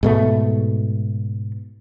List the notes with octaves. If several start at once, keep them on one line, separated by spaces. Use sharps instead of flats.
G#2 B2 A3